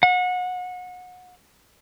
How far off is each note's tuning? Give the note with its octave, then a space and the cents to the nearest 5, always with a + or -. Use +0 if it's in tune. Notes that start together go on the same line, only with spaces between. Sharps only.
F#5 -30